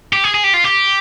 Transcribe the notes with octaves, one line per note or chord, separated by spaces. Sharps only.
G4
G#4
G#4
G4
F4
G4